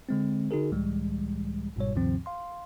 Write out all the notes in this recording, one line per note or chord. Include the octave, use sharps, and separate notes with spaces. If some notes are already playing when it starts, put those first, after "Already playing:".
D3 G#3 C4
D3 D#4 F#4 G#4 A#4
C#2 A2 E3 G3 G#3
G1 G#2 B2 G3 C#5
D2 G2 C3 D#3 F3 C4
F5 C6